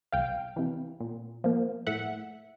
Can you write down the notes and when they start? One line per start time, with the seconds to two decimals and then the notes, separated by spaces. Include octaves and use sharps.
0.12 C2 F5 G5
0.56 C3 E3
1.00 A#2
1.44 F3 A#3
1.87 A2 E5 F#5